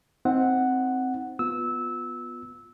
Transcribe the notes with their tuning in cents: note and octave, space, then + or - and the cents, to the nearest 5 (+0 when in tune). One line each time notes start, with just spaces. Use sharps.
C4 +0 D#4 +25 F#5 +0
B3 +0 F4 +15 E6 -20